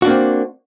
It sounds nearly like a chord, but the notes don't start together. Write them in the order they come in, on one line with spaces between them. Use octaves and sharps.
F#4 D4 A#3 C4